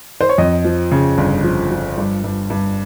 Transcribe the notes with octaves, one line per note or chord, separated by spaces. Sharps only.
C5
C#5
F2 D#5
F3
C#3
G1
F3
F3
G2
G2
G2